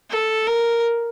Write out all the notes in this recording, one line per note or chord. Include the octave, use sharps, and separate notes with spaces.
A4
A#4